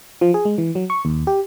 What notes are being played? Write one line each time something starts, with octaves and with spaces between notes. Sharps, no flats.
F3
G#4
G#3
E3
F#3
C#6
D#2
G4